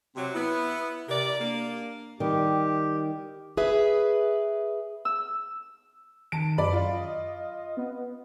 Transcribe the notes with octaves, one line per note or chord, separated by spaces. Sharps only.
C3 F#3 C4
B3 E4
C3 G4 A#4 D5
A#3 D4
D#3 G3 G4
G#4 B4 E5
E6
D#3 A5 D7
F#2 D5 B5
F4
D#5
B3